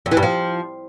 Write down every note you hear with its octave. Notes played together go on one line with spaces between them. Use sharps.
F2
E3
G2
F3